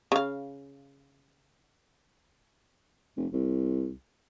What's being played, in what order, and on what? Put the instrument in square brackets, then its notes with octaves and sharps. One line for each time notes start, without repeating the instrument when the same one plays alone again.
[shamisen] C#3 F5
[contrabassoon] F1
C2